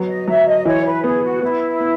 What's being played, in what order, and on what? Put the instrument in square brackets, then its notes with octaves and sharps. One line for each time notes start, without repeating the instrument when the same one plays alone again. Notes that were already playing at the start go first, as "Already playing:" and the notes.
Already playing: [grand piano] F#3 B3
[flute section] D#5
[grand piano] F#3 [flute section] E5
[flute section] D#5
[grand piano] E3 [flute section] C#5
[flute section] B4
[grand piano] B3 [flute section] G#4
[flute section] F#4
[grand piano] B3 [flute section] E4
[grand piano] B3